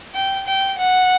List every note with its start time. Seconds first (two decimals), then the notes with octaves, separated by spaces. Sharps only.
0.14 G5
0.47 G5
0.78 F#5